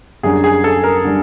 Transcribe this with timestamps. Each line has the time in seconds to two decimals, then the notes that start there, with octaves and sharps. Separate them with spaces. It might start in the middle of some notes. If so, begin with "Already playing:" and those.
0.23 F#2 D3 G3 G#4
0.44 G#4
0.64 A4
0.83 A#4
1.05 D3 G3